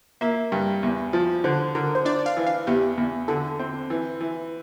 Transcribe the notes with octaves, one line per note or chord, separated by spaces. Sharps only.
A#3 E5
G2
E2
F3
D3 C5
D3 A#4
C5
D4 D5
F5
E3
F5
E2 G4
E2
D3 A4
C4
E3
E3